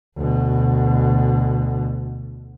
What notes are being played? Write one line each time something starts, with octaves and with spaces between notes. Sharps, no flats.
D2 B2